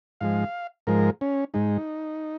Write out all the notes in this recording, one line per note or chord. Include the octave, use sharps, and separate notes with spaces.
G#2 F3 G#3 F5
G#2 F3 G#3 A#4
C#4
G#2 G#3 D#4